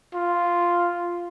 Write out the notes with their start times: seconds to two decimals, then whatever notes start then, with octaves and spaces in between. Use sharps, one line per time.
0.14 F4